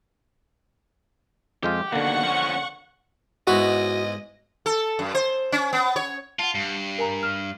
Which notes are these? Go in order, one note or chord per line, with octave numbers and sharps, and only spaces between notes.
F2 G#3 F4 G4
D#2 B2 D3 A#3 F#5 C#6
F3 C#4
G#2 B3 E4 F#4 D#5
A4
F#2
C5
C#4
B3
C#5
F4 F#5 A5
G2
A#4 G#5 A#5
F6 E7